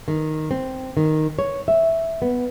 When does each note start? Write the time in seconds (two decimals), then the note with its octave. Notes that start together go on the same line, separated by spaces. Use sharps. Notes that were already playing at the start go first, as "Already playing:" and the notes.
0.08 D#3
0.51 C4
0.97 D#3
1.39 C#5
1.68 E5
2.22 B3